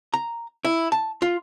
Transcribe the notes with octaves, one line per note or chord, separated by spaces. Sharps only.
A#5
E4
A5
F4